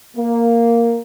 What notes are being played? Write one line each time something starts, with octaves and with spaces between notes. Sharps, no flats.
A#3